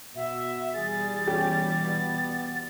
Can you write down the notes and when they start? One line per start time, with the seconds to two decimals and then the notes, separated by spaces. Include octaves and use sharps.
0.16 B2 F#4 E5
0.74 B2 E3 G3 G#4 A6
1.27 C#4 G4
1.84 B3